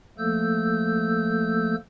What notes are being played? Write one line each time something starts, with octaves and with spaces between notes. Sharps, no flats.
F3 A3 A#3 A4 E6 G6